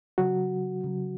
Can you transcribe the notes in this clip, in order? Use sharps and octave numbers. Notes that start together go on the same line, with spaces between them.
C#3 F#3 F#4
C#3 F#3